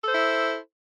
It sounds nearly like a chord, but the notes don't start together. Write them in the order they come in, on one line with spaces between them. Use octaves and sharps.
A4 C5 E4